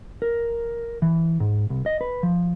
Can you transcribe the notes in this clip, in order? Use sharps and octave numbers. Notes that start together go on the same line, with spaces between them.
A#4
E3
G#2
C2
D#5
B4
F3